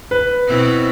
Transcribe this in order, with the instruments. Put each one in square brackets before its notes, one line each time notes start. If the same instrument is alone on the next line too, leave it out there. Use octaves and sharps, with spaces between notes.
[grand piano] B4
[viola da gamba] B2 C4 E4